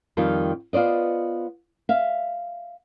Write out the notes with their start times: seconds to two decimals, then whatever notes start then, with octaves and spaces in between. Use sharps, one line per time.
0.17 F2 D#3 G3 F4
0.73 B3 F4 C5 D5 D#5
1.89 E5 F5